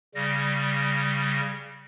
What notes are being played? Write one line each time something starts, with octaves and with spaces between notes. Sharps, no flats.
C#3 G3 A#6